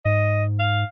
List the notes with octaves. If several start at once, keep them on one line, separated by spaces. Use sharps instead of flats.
G#2 D#5
F5